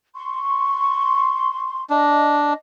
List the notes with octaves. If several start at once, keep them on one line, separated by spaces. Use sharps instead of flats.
C6 C#6
D4 D#5